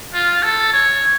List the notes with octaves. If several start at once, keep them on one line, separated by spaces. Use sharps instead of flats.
F4
A4
C#5